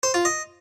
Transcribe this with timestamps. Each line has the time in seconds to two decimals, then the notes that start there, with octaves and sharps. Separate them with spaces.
0.03 C5
0.14 F4
0.25 D#5